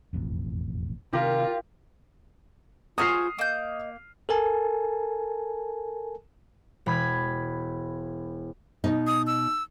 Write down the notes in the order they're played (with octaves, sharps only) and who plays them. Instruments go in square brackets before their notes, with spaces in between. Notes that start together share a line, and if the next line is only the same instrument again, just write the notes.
[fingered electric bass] E1 A1 F2
[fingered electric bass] C3 D#3 [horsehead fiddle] F4 [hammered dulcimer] G4 A#4
[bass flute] F4 [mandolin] F#4 G#4 C5 [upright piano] D#6 F6 C7
[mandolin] A#3 G6 [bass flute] D#5
[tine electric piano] A4 A#4 G#5 A5
[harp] E1 B5 G#6
[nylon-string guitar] B2 D#4
[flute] D#6
E6